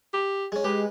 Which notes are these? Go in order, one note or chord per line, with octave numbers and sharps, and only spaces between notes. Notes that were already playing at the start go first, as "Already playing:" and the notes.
G4
G#3 C#4
G#3 G4 B4